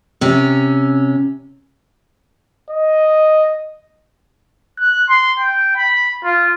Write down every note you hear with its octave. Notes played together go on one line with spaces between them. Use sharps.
C3 C#4
D#5
F#6
C6
G5
B5
F4